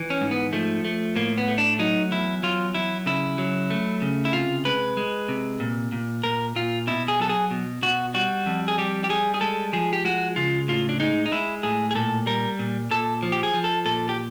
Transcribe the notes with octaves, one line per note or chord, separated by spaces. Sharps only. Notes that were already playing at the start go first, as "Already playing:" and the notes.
Already playing: E3
C#4
G#2
B3
F3 A3
A3
A2 A#3
B3
A3
D4
F#3 D#4
E2 E4
F#3 F4
F#3 E4
C#3 E4
F#3
A3
C#3
E4
C3 F4
G#3 B4
G#3
C3
A#2
A#2
A#2 A#4
A#2 F4
B2 E4
G#4
F#3 A4
G#4
B2
B2 F#4
G3 F#4
F2
G#4
G3 G4
G4
G3 G#4
G#4
G#3 A4
F3 G#4
G4
G#3 F#4
C#3 F4
A2 F4
D4
G#3 D#4
D#4
G#3 E4
A2 G#4
G#4
A#2 A4
G3 A#4
A#2
A#2 A4
F3
G4
G#4
F3
A4
A#2 A4
G4